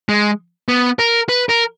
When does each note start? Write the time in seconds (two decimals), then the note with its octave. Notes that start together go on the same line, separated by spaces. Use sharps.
0.09 G#3
0.68 B3
0.99 A#4
1.29 B4
1.49 A#4